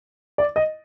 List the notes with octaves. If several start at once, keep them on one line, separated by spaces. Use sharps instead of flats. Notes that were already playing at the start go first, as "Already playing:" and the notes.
D5
D#5